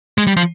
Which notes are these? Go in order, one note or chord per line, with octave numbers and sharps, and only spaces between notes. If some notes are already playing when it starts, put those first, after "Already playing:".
G#3
G3
F3